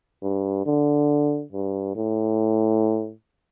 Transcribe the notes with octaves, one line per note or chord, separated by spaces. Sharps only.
G2
D3
G2
A2